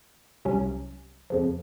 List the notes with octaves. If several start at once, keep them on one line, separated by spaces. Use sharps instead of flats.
C2 C3 F#3 C#4
F2 C#3 F3